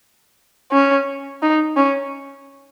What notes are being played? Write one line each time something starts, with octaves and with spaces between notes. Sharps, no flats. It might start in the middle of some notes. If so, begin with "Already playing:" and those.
C#4
D#4
C#4